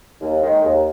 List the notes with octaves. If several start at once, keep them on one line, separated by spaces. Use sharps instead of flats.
D#2
D#3 G#3
D#2